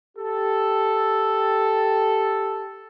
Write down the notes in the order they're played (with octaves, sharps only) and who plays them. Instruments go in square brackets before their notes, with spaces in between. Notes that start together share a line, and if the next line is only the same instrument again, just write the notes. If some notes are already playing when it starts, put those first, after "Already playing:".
[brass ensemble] G4 A4